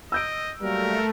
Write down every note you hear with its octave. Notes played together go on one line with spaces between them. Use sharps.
D#5 E6 G6 D7
F#3 G3 A3 A#3 A#4